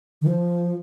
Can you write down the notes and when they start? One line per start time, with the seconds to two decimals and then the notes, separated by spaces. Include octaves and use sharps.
0.22 D#3
0.26 F3